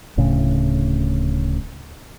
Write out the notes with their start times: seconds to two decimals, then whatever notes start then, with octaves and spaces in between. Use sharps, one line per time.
0.17 D1 A2 C#3